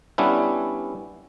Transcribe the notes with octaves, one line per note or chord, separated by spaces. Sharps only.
G3 B3 C#4 D4 E4